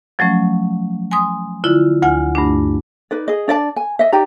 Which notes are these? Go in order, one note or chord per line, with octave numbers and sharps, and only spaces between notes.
F3 F#3 A3 C#4
G#5 C6 D#6
D3 E4 F4
D2 F#5 G#5 F6
G2 A3 D4
D#4 B4 D5
G#4 D#5
D4 D5 D#5 A5
G#5
D#5 E5
D#4 G4 D5 A#5